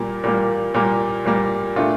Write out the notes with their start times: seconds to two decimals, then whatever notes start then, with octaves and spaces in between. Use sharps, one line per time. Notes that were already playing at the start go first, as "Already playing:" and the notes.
Already playing: A#2 G3 A#3
0.24 A#2 G3 A#3
0.74 A#2 G3 A#3
1.25 A#2 G3 A#3
1.76 A#2 A3 D4 F4